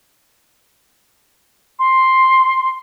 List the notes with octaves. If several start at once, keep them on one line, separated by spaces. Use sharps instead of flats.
C6